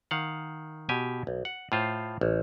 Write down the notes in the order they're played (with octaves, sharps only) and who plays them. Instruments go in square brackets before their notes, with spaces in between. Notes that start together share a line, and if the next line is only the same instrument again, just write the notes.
[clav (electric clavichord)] D#3 F5 F#5
B2 G4 G#5
B1
F#5
A2 F4 C5
A1